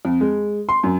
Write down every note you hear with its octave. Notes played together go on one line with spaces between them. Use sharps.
F2
G#3
C6
F#2